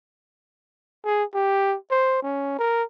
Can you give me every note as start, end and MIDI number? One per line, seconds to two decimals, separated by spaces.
1.05 1.24 68
1.34 1.77 67
1.91 2.21 72
2.23 2.58 61
2.59 2.83 70